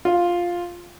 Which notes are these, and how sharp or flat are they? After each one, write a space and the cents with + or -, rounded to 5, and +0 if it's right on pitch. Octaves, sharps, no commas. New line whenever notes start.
F4 +5